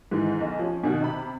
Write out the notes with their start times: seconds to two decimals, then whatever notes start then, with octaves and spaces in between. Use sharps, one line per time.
0.11 G#2 D#3 E3
0.41 B1
0.59 F3 C#4
0.84 B2 D#3 F#4
1.01 C3 B5